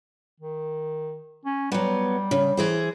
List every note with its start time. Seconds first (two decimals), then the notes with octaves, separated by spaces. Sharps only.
0.40 D#3
1.45 C#4
1.72 F#3 G3 B3
2.31 C#3
2.57 E3 G#4 C5